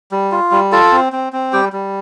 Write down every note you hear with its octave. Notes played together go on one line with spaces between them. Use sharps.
G3
F4
G3
F4 A4 A5
C4
C4
C4
G3 G4 G5
G3